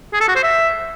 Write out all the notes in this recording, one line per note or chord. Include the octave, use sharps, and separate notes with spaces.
G#4
A4
F#4
C5
E5